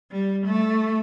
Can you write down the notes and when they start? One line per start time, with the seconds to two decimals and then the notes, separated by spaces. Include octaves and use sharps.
0.12 G3
0.46 A3